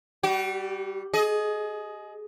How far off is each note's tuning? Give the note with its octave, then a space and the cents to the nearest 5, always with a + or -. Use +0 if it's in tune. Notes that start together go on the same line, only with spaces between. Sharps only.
G3 +0 F#4 +45
G#4 +30 D#5 +5